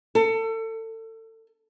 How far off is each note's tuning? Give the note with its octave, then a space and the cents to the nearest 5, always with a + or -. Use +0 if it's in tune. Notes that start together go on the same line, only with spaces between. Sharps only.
A4 +30